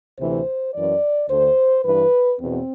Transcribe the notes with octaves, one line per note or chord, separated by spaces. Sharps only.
D2 C3 E3 C5
F#2 E3 D5
D2 D3 C5
G2 E3 B4
E2 B2 C4